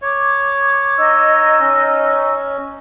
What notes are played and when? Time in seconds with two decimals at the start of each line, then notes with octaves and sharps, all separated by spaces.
0.02 C#5 D6
0.96 D#4 D#5 E6
1.60 C#4